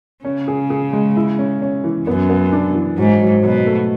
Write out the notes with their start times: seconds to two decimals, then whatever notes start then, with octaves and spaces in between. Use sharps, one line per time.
0.25 C#3 C#4
0.48 G#4
0.70 G#4
0.93 G#3
1.16 E4
1.38 C#4
1.62 C#4
1.84 E3
2.07 F#2 B3
2.30 B3
2.52 D4
2.75 E3
2.98 G#2 F#3
3.21 F#3
3.43 B2 F#3
3.66 A3